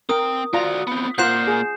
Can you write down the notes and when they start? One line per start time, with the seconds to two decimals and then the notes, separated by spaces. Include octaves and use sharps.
0.09 C4 A#4 G5 D#6
0.53 F4 F#4 D5 A#5
0.87 B3 C4
1.18 A#2 A#3 F4 C5 F#5 G6 C7 E7
1.48 G#4